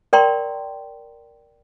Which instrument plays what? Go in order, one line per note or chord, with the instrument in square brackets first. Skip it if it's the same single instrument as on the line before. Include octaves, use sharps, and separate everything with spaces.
[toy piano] A#4 D5 G5 A#5 C6 C#6